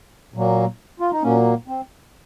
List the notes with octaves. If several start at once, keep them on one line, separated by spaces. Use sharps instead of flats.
A#2 F#3 A#3
F4
D#4
A#2 F#3 A#3 C#4
C4